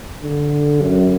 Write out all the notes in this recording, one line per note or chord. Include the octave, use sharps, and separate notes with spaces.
D3
F#2